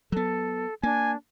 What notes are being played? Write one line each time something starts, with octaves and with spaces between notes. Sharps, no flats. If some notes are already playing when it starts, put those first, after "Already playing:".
F#3 B3 A4
A#3 D4 G#5